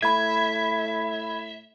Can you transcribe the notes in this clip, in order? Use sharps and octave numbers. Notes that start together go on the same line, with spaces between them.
A2 E5 B5 G#6